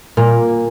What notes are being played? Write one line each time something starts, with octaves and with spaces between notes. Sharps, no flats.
A#2 A#3